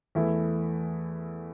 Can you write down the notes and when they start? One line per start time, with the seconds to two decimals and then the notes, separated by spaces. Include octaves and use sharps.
0.15 E2 E3 A3 E4